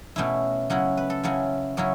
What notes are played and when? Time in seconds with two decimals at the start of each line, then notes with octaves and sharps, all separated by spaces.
0.16 B2 A3 C#4 E4
0.70 C#3 F#3 C#4 E4 F#5
0.97 B4
1.10 A4
1.23 C#3 F#3 C#4 E4 C#5
1.77 C#3 F#3 C#4 E4 C#5